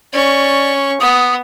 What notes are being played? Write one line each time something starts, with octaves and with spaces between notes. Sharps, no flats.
C#4 D5 C#6
B3 D#6